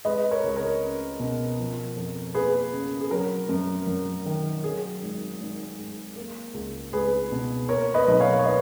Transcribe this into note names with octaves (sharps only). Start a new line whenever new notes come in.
G#3 B4 D#5
A#4 C#5
C#2
A#4 C#5
C#4
B2
F3
F2
A#3 G#4 B4
C#3
G#4
F#3 A#4
F#2
F#2
D#3
F#3 G#4
G#1
G#1
G#2
A#3
C#2
C#2 G#4 B4
B2
A#3 A#4 C#5
B4 D#5
B1
C#5 F5
C#5
D#4 B4 D#5